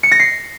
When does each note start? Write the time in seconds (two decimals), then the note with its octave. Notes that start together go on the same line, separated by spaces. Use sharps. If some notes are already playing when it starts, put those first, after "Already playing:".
0.03 C#7
0.11 A#6
0.19 C7